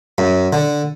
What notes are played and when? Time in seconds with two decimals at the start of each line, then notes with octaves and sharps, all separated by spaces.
0.18 F#2
0.53 D3